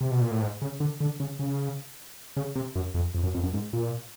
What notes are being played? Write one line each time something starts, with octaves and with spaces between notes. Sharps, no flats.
C3
B2
A#2
A2
G#2
C#3
D3
D3
C#3
C#3
C#3
C3
F#2
F2
F2
F#2
F2
F#2
G#2
A#2